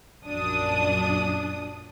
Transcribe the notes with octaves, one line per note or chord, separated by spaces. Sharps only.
A#1 F#2 D4 D#6